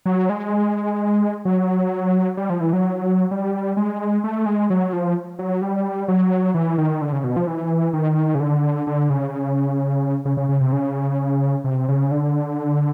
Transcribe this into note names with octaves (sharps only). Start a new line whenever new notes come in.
F#3
G#3
F#3
G3
F3
E3
F#3
G3
G#3
A3
G#3
F#3
F3
F#3
G3
F#3
E3
D#3
D3
C#3
B2
F3
E3
D#3
C#3
D3
D3
C#3
C#3
C#3
C#3
C3
C#3
C3
C#3
D3